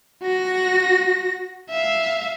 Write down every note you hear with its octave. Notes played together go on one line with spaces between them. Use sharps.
F#4 A#6
E5 F5